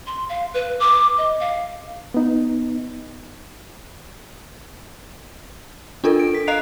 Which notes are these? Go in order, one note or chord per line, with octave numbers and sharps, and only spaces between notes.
C6
F5
B4
D6
D#5
F5
B3 D#4
D4 F4 A4 A#4
D7
B6
D#5 F5 A#5 F#6 C7 F7